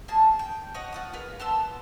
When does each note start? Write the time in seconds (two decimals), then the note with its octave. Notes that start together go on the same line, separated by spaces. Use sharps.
0.08 A#3 G#4 A5
0.39 G5
0.74 C#5 D#5 F#5
0.92 F4 F#5 D#6
1.13 F4 G#4 A#4 B4
1.40 B3 A5 C6 E6